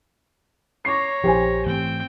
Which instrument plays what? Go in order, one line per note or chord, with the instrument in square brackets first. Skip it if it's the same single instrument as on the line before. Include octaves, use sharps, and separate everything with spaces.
[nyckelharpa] C#5 A#5 [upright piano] C#6 D6 C7
[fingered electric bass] A#1 F3 [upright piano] G4 C5 G#5
[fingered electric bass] G#2 E3 A3 [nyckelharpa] C4 G5